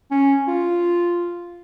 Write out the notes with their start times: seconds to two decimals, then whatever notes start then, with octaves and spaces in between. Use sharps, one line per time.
0.11 C#4
0.48 F4